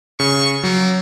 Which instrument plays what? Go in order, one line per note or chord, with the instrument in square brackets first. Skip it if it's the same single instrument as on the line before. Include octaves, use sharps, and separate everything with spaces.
[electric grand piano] C#3 [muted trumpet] C#6
[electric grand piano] F#3 [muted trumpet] A#3